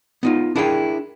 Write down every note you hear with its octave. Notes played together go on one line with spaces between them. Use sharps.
B3 D#4 F4
D4 E4 G#4 A#4 F#5 G5